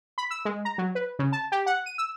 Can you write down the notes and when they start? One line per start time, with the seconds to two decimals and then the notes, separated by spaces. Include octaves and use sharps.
0.18 B5
0.31 E6
0.45 G#3
0.65 A#5
0.78 F#3
0.95 B4
1.19 C#3
1.32 A5
1.52 G4
1.66 F#5
1.86 D#7
1.98 E6